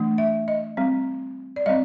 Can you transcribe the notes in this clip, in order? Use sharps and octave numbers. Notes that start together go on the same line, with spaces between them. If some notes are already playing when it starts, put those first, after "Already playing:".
Already playing: E3 A3 D4
E5
D#5
G3 C4
D5
G3 C4 D#5